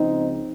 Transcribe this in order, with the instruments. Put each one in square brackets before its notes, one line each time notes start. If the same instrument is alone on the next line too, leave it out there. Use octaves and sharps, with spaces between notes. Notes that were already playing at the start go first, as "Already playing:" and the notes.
Already playing: [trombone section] C#2 C#3 F3 C4 D#4